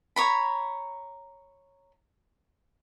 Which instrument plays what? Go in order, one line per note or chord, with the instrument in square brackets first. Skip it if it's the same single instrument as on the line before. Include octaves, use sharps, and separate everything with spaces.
[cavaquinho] C#5 A#5 B5